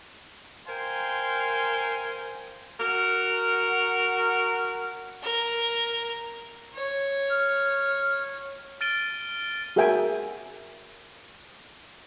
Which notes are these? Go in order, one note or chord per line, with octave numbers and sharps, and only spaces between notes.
A#4 C5 F5 G5 G#5 C6
F#4 A#4
A#4
C#5
F6
F6 A6 D7 D#7 G7
F#4 G#4 A#4 E5 G5 G#5